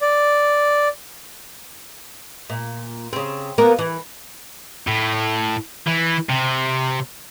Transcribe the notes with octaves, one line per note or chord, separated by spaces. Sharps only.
D5
A#2
C#3 C4
A#3 B3 A#4
E3
A2
E3
C3